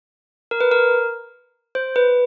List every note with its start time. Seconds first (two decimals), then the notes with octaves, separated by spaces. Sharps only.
0.51 A#4
0.61 B4
0.71 A#4
1.75 C5
1.96 B4